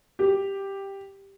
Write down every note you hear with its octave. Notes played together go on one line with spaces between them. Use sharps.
G4